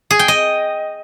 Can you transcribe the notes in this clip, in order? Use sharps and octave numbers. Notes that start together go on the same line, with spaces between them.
G#4
G5
D#5